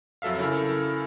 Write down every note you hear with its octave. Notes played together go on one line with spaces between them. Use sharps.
F2 F#3 A4 E5 F5
C#3 E4 A4 A#4